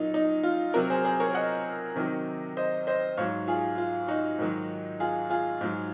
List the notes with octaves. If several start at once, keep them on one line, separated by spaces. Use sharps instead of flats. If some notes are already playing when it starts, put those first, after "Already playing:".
Already playing: A#2 F#3 D#4
D#4
F4
C3 F#3 F#4 A#4
G#4 C5
G#4 C5
A#4 C#5
D#5 F#5
C3 D#3 F#3
C5 D#5
C5 D#5
G#2 F#3 C#5 F5
F4 G#4
F4
D#4 F#4
G#2 D#3 F#3
F4 G#4
F4 G#4
G#2 F#3